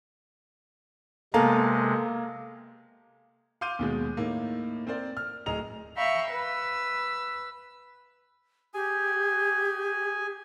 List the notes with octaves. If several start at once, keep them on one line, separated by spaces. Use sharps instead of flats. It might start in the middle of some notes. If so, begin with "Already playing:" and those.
C3 G#3 A#3 B3 A4 F5 A#5
F5 C6 D6 G6 D#7
D#2 B2 G#3
A2 A#3 D#4
C4 A#4 C5 D5
F6
D1 G#4 D#5 A#5 F7
E5 F5 G5 A#5 B5 C#6
B4 E6
G4 G#4 G#5